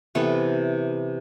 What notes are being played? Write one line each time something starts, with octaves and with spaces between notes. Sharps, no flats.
C3 E3 B3 A4